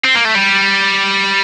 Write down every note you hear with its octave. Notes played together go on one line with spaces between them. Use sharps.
C4
A#3
A3
G3